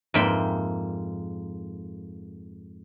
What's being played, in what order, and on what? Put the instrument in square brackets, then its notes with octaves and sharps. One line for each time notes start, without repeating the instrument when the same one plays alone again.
[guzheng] F2 G#2 A#3 E5 G5 B5